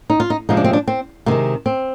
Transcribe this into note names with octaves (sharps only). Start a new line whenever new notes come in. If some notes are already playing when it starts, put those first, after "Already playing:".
D#4
F4
D#4
C3 F3 G#3 D#4
D4
C4
D4
C4
C3 D#3 G#3 A#3
C4